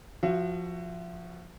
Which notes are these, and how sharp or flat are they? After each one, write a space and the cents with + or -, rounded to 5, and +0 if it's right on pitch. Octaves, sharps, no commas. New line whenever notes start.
F3 +0 F#4 +0 E5 +35